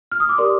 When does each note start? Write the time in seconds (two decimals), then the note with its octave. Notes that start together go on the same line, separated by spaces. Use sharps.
0.12 F6
0.20 D#6
0.29 D6
0.38 G4 A#4 D5 C6